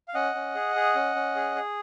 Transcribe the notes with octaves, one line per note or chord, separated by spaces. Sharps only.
F5
C#4 D#5 F#5
C#4
G#4
G#4
C#4
C#4
G#4
G#4